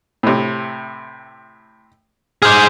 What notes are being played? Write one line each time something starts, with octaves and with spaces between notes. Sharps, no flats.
A2 C3
G#4 C5 D6 F6